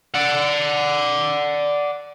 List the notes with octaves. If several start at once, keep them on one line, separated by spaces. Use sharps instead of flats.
D5 F#5